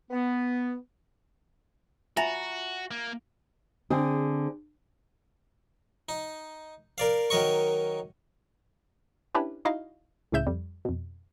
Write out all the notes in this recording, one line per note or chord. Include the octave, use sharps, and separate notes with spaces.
B3
F4 F#4 E5 G#5 A#5
A#3
D3 C4 G#4
D#4
A#4 D5 F5
D#3 F#3 A#4 D#5 C#6
C#4 D4 E4 G4 B4
D#4 E4 F#4 D#5 F5
C#2 A2 C#3 E5 G6 E7
F2 G3
F2 B2